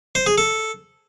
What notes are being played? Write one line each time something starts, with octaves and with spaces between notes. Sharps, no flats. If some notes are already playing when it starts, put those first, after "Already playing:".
C5
G#4
A4